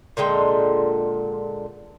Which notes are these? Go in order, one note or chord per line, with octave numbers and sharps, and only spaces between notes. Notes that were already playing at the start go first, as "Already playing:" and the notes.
A#2 D3 G#3 G5